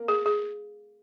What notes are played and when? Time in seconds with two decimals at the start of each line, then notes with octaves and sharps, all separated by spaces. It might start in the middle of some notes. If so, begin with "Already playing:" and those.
Already playing: A#3
0.08 G#4
0.26 G#4